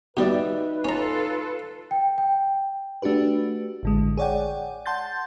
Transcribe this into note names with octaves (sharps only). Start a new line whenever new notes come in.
B2 G3 D#4 B4 D5 E5
C#4 F4 A4 A#5
G5
G5
A3 D4 F#4 G4 B4
A1 D3 G#3
G#4 C#5 D5 F#5 G5
F#5 A5 C6 G6 A6